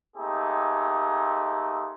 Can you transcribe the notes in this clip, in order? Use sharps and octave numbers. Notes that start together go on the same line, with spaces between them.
A3 A#3 C4 D#4 G4 G#4